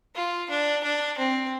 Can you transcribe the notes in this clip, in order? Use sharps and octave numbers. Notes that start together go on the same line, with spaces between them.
F4
D4
D4
C4